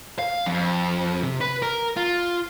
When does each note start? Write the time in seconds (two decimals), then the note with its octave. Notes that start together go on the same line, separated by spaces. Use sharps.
0.19 F5
0.46 F2
1.23 C3
1.41 B4
1.62 A#4
1.96 F4